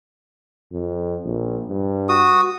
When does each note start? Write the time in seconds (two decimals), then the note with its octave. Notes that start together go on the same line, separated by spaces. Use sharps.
0.72 F2
1.25 A#1
1.69 G2
2.09 F#4 D#6